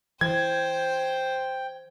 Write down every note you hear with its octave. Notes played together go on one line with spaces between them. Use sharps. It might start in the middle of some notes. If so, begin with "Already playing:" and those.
E3 C5 G5 G#6